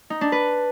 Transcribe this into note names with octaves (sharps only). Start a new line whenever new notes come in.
D#4
D4
B4